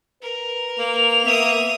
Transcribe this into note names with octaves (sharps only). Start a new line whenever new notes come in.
A#4 B4
A#3 F7
B3 E5 D#6